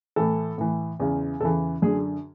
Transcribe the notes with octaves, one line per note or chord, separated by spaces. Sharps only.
A2 E3 A4
A2 E3
E2 C#3 E3
E2 C#3 E3 A4
F#2 D3 G#4